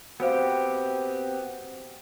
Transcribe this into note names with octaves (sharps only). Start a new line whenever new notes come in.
B3 C4 F#4 G4 C5 F5